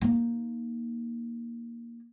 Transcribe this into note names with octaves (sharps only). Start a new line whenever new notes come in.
A#3 D#4